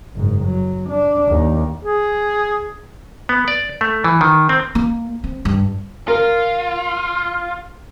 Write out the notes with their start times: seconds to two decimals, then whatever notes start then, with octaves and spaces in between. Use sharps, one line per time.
0.14 F#1 G#2
0.45 F#3
0.89 D4
1.28 D#2
1.84 G#4
3.29 B3
3.48 D5
3.81 A3
4.04 E3
4.21 D#3
4.49 C4
4.75 A#3
5.24 C4
5.45 G2
6.08 F4 A#4